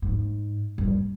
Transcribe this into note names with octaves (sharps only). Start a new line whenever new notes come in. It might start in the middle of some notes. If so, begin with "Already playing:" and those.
G#2
G2